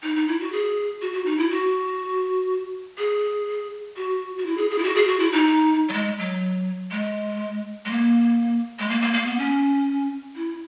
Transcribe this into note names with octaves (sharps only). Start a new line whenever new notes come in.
D#4
D#4
E4
F#4
G#4
F#4
F#4
D#4
E4
F#4
G#4
F#4
F#4
E4
G#4
G#4
E4
F#4
G#4
F#4
E4
D#4
F#3
G#3
F#3
G#3
G#3
A#3
G#3
A#3
A#3
A#3
B3
C#4
E4